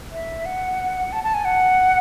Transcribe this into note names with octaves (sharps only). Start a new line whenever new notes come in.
E5
F#5
A5
A5
G#5
F#5